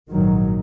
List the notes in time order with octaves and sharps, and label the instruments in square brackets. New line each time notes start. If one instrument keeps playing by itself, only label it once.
[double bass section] A#1 G#2 D#3 F#3